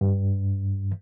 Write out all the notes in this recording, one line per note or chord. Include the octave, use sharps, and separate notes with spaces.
G2